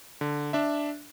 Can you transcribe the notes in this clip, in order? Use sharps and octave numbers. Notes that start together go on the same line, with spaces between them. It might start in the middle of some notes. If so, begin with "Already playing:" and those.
D3
D4 E5